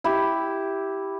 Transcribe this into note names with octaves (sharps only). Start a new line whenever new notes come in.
E4 G4